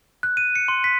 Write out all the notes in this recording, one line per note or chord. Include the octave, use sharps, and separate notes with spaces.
F#6
D#7
C#7
C6
B6